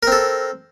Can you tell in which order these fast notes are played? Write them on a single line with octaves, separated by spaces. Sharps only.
A#4 C4 A4